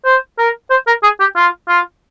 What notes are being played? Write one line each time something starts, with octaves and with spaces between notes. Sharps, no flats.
C5
A#4
C5
A#4
G#4
G4
F4
F4